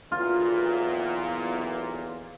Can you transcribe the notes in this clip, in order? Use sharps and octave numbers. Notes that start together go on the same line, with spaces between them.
B1 E2 A#2 F4